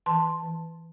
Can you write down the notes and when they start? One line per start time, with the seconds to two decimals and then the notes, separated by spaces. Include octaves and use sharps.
0.06 E3 A5 C6
0.43 E3